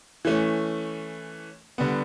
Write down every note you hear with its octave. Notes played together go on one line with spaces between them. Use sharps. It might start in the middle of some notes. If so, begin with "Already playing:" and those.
E3 A3 C#4
D3 G3 B3